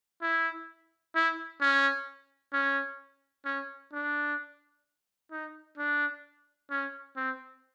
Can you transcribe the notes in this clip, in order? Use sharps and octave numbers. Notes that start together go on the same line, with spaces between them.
E4
E4
C#4
C#4
C#4
D4
D#4
D4
C#4
C4